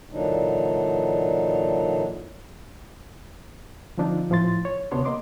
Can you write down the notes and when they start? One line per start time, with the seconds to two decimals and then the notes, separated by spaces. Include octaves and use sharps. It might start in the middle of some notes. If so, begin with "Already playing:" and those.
0.11 A#2 D3 E3 F#3 D4 D#4
3.97 D3 F3 C4 D4 D#4 F4
4.30 A2 F3 E4 C6 A6
4.65 C#5
4.91 D2 C3 B3 D4 C#5 C6
5.05 A#3 D#5 C6 D6